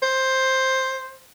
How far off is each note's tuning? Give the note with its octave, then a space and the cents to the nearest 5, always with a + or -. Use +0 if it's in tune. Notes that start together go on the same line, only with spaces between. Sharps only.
C5 +10